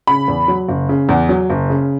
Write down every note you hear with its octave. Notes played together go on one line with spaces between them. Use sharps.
C#3 B5
E2
F#3
F#1
C#3
E2
F#3
F#1
C#3